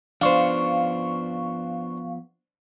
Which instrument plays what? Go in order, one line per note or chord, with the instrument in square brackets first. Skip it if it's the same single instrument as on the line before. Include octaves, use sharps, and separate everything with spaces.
[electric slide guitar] F3 B3 [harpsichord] D4 C5 [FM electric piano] F5 C#6